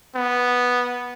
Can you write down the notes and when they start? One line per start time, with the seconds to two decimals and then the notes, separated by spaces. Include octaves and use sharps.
0.16 B3